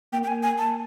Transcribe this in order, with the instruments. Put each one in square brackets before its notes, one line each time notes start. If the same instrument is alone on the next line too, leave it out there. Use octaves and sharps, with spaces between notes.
[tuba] A#3 [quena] G5
[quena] G5
G#5
G#5
A5